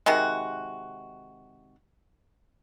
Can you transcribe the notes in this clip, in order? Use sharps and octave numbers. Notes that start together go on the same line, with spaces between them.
C3 D#3 G#3 F#4